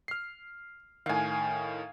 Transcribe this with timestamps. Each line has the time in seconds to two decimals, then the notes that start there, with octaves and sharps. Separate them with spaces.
0.08 F6 C7
1.06 A2 D#3 F5 G#5